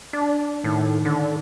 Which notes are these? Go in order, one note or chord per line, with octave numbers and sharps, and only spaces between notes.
D4
A2 D#3
D3